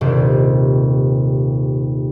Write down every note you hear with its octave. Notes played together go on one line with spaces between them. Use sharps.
D#1 C3 D#3